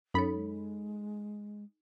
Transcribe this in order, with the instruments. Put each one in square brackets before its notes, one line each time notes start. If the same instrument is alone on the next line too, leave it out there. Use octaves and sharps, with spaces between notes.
[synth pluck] F#2 B5 [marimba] D#4 A4 C#5
[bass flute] G#3